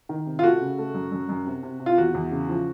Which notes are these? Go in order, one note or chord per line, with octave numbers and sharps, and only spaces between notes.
D#3
C3
F4
A3 F#4
C#3
A3
F#2
F#2
F#2
C3
C3
C3
F4
E2 F#4
E2
C#3
F3